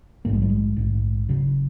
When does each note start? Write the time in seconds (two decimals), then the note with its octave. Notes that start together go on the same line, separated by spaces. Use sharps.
0.25 A#1 G#2 A#3
0.34 G#3
0.42 F#3
0.50 G#3
0.77 A#1 G#2
1.29 F#1 F#2 C#3